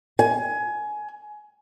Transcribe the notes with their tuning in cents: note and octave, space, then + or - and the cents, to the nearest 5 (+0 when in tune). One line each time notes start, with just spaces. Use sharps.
G#5 +20